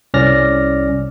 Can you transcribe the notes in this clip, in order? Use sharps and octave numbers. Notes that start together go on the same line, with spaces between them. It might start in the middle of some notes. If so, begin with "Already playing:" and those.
C2 C#4 D5 F6 A#6